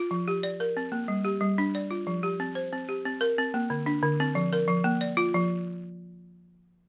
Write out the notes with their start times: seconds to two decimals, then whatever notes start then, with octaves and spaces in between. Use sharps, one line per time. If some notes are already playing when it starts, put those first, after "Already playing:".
Already playing: F4
0.11 F3
0.28 G4
0.43 D5
0.60 A#4
0.77 C4
0.92 A#3
1.08 G3
1.25 G4
1.41 G3
1.58 D4
1.75 D5
1.91 F4
2.07 F3
2.23 G4
2.40 C4
2.55 C5
2.73 C4
2.89 G4
3.05 C4
3.21 A#4
3.38 C4
3.54 A#3
3.70 D3
3.86 D4
4.03 D3
4.20 C4
4.35 F3
4.53 A#4
4.68 F3
4.84 A#3
5.01 D5
5.17 F4
5.34 F3